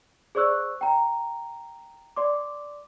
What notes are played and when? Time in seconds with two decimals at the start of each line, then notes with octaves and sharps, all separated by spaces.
0.35 G#4 C5 D5 C#6 E6 F#6
0.81 G5 A#5
2.16 D5 C6 D6